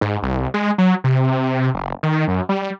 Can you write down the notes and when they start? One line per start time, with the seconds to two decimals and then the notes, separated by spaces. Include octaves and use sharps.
0.01 G#2
0.23 C2
0.54 G#3
0.78 F#3
1.04 C3
1.31 C3
1.74 F#1
2.03 D#3
2.28 F#2
2.49 G3